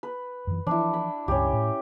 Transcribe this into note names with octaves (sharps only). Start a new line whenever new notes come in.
B4
F#2 E3
E3 F3 D4 E4
B5
C#2 G2 C#4 G4
A2